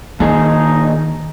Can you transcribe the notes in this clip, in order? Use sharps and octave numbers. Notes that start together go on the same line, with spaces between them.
A#2 D#3 D#4 G#4